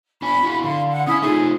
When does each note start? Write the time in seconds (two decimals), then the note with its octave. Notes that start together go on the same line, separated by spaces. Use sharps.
0.22 D4 G#5 B5
0.43 E4 F#4 F5
0.64 D3 F5 C6
0.91 F#5
1.07 C#4 E4 G#5 D#6
1.22 A3 D#4 F4 G#4